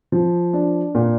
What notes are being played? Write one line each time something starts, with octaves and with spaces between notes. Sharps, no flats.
F3
D4
A#2